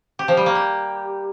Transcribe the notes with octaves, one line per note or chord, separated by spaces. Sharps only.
G4
F3
G3
A#3
G4